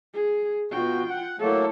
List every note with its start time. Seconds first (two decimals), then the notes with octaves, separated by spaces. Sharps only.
0.14 G#4
0.72 B2 F4 F#4 G5
1.09 F#5
1.39 F#3 A3 A#3 E4 A4